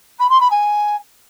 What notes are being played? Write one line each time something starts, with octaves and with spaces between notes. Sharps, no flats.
B5
C6
B5
G#5